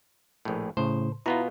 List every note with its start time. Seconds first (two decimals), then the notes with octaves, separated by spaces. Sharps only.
0.45 A#1 A2
0.77 A2 C#3 C5
1.26 B2 B3 E4 F4 A#5